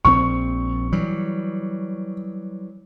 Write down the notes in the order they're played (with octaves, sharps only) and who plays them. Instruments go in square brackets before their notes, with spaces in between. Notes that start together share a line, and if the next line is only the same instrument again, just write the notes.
[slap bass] A#1 E3 C4 [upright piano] C#6
[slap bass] E3 F#3 G3